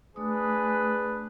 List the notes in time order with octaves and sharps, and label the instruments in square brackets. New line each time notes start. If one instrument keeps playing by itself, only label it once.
[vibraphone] A3 D#6 [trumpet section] D4 G#4 B4